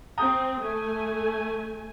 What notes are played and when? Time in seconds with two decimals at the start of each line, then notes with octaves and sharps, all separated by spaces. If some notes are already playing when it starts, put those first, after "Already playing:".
0.18 C4 A#5 D#6 G6
0.61 A3 G#5